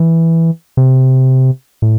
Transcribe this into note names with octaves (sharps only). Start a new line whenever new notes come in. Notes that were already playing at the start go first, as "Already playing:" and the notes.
Already playing: E3
C3
A2